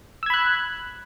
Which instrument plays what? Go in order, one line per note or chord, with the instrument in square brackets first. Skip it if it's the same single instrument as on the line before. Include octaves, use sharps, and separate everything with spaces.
[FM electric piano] E6
G#6
B5
F#6